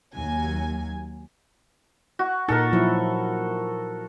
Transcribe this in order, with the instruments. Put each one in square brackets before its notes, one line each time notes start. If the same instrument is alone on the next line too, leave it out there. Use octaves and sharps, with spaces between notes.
[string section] D#2 F#3 G#5
[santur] F#4
[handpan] A#2 D#4 [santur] A4 A#4
[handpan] F3 F#3 E4